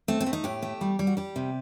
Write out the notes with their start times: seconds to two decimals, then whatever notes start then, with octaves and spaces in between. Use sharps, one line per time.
0.08 A3 C4
0.20 C4
0.26 A3
0.33 D#4
0.44 A2 G4
0.62 A3
0.81 G3
0.99 G3
1.07 F#4
1.17 G3 G4
1.36 C3